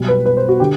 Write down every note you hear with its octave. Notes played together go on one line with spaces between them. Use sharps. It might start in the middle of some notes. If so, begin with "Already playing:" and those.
Already playing: B1 B2 G3
B4
B4
C5
F#4
D3 G4